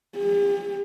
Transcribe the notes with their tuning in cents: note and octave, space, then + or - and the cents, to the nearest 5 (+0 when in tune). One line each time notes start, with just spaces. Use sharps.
G4 +45